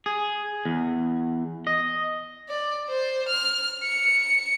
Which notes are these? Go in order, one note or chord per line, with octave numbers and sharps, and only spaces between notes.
G#4
E2
D#5
D5
C5
F6
C#7